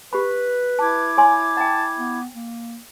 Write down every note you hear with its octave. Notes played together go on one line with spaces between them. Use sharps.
G4 B4 B5
E4 A5 D6 G#6
C#5 G#5 C6
F#5 G5 A5
B3
A#3